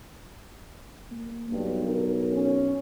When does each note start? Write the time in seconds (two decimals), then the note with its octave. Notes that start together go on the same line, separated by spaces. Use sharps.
1.11 A#3
1.51 B1 G2
1.84 A#4
2.33 C#4